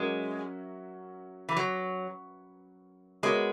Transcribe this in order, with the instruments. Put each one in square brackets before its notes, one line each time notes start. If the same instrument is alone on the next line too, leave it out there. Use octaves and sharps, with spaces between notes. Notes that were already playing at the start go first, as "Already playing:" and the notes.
Already playing: [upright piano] F#3 C#4 F#4 A#4 E5 [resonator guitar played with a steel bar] G#3
[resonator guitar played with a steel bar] E3
F#3
[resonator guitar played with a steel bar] G#3 [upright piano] B3 F#4 A#4 C#5 E5